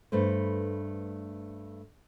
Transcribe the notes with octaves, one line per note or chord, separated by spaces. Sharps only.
G2 A3 B4 C5